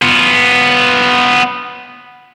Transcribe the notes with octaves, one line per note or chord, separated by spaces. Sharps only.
B3 F4